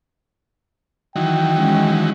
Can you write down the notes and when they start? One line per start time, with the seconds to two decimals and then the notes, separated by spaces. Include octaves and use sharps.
1.16 D#3 E3 F#3 G5
1.55 G#3 C#4